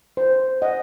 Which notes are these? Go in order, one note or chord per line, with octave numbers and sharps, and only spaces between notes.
C5
D#5 F#5